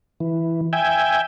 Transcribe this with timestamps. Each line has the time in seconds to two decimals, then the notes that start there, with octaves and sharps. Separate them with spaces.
0.20 E3
0.73 E5 G5 G#5